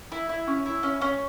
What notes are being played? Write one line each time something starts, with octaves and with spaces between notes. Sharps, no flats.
E4
E4
C#4
E4
C#4
C#4